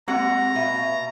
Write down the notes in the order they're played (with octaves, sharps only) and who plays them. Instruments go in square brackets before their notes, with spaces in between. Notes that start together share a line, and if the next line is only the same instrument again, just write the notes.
[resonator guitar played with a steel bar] G#3 F#4 F#5 [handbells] A#3 C4 G4 [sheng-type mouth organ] A#5
[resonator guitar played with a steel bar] B2 [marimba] E5 F5